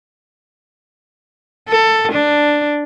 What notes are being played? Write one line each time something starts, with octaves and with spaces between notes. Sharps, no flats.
A4
D4